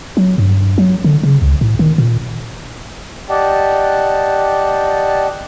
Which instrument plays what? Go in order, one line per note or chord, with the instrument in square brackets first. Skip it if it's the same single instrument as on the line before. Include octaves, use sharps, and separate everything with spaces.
[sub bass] F#3
G2
F#3
D3
C#3
C#2
A2
D#3
A#2
[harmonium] G4 D5 D#5 F#5 G5 A5